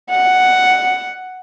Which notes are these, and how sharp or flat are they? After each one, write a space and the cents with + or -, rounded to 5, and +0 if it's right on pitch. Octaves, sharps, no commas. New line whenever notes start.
F#5 +0